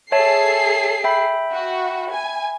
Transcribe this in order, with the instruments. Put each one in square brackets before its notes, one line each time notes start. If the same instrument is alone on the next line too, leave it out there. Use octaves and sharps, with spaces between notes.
[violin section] G#4 A4 C7 [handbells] C#5 E5 A5
[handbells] E5 G5 B5
[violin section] F#4
G#5